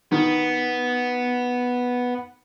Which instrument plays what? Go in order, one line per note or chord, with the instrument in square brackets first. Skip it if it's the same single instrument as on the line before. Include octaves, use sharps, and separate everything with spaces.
[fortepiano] D#3 [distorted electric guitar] B3